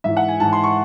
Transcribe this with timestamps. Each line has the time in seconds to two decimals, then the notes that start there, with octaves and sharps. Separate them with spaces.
0.04 G#2 E3 E5
0.17 F#5
0.28 G#5
0.40 G#2 E3 A5
0.53 C6
0.64 C#6